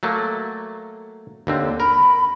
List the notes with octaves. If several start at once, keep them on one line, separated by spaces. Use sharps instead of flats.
F#3 A3 A#3
D#2 D3 C4
A#4 B5